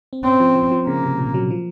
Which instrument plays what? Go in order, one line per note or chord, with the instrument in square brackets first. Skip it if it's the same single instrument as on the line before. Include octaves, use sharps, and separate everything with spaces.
[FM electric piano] C4
[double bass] C4 [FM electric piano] C#4
[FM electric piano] F3
F3
F3
[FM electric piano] C#3 [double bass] A#3
[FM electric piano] C3
A#2
F#3
F3